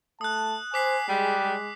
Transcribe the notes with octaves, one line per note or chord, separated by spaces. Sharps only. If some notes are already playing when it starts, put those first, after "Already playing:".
A3 A5 D#6 F#6
C5 G#5 D6 B6 C7
G3 G#3 G#4
G#3